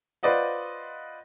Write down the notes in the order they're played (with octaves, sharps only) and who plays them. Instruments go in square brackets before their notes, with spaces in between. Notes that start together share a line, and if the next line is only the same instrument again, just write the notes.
[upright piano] F4 B4 C5 D5 D#5 F#5